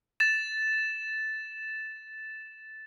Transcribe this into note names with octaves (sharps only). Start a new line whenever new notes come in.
A6 E7